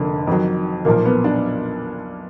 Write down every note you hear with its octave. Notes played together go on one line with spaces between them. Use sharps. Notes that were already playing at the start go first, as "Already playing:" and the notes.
Already playing: F1 F2 D3 A#3
F2 D#3 F#3
B1 A#2 F3 A#3
B3
D4